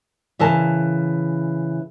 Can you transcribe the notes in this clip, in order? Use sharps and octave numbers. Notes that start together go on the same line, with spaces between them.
C#3 E3 A#4 A5